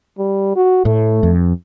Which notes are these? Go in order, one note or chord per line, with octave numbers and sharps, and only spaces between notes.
G3
F#4
A2 A3
F2